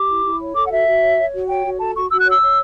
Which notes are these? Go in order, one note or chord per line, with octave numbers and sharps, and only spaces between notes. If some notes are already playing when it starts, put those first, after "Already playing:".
Already playing: G4 D6
E4
E4
C#5
A4 D6
F#5
F#4 E5
F#4
C#5
C#5
F#4
C#5 G5
F#4
A4 A5
F#4 C#6
F#4 E6
F#6
C#5 E6
C#5